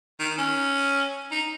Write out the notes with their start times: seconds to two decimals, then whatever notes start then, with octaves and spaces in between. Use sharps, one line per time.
0.20 D#3
0.38 C#4
1.31 D#4